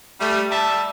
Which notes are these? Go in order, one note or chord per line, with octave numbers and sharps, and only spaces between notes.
G3 A3
G3 D5 E5 A5